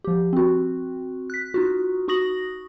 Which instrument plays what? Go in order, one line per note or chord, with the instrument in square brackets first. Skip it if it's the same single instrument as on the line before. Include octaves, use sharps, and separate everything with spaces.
[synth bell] F3 G4
C4 F#4
F#6 B6
D#4 F4 F#4
D#4 F#4 C#6 D#6 A#6 F#7